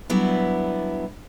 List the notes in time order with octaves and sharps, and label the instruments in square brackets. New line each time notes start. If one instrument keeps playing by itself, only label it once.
[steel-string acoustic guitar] F#3 G3 B3 D4 E4